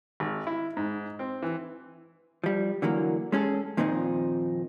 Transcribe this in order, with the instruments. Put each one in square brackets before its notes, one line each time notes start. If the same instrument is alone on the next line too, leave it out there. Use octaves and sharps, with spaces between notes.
[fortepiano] G#1
E4
G#2
C4
E3
[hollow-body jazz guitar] F3 G3
D3 E3 F#3 A#3
G#3 C#4 G#4 A4
F2 A#2 D#3 F3 C4 D#4